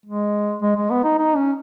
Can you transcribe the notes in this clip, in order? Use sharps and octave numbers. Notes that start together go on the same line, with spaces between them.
G#3
G#3
G#3
B3
D#4
D#4
C#4